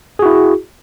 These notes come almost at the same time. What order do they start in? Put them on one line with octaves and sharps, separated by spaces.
G#4 F#4 E4